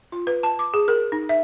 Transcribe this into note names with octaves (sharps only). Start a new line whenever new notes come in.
F4
B4
A5
D6
G#4
A#4
D#4
E5